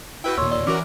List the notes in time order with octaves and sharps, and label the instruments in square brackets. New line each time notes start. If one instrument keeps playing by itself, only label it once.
[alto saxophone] E4 [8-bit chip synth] F#4 B4 G5
[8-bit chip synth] D#2 A#2 [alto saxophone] C#5 [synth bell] C6 C#6 E6
[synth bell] D5 C6 E6
[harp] E3 D6 F6 [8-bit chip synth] C#4 F#4 A#4